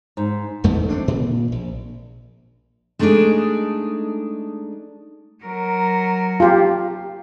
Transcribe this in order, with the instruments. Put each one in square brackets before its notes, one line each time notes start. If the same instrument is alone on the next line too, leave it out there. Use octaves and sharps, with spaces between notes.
[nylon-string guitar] G#2
[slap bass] E1 E2 G#2 A3
A3 C4 D4
A#2
A#1
[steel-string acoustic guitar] G#3 A3 D4 D#4 G#4 D5
[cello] F#3 A#4
[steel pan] F4 G4